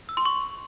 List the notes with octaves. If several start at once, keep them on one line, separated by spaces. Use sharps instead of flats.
E6
C6
C#6